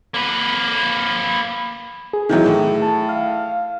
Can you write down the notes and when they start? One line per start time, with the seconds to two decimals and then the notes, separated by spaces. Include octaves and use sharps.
0.14 A#3 B4
2.13 G#4
2.29 D#3 E3 F#3
2.46 A2
2.82 A5
3.09 F5